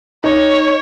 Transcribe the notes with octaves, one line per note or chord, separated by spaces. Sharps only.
D#4 C#5